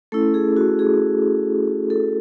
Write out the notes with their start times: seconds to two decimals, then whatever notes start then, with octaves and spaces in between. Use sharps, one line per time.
0.12 A3 C#4 E4 A4
0.34 G#4
0.57 F#4
0.79 G#4
1.90 A4